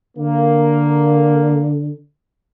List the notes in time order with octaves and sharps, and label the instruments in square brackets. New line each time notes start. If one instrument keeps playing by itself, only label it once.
[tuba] D3 [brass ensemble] A#3